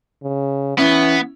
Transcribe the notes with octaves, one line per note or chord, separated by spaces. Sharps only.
C#3
E3 B3 C#4 E4